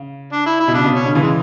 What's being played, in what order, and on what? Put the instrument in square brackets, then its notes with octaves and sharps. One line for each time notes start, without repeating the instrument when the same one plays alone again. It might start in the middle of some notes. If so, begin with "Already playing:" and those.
Already playing: [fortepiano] C#3
[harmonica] D4
E4
E4
[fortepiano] B2
[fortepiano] C#3 [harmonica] D4
[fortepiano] B2
[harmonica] C#4
[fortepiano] B2 D3
C#3 E3
[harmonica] G#3